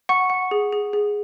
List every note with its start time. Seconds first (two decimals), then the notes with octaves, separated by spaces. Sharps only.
0.09 F#5 C#6
0.30 F#5
0.51 G#4
0.72 G#4
0.93 G#4